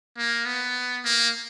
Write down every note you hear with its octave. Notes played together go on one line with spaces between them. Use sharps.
A#3
B3
A#3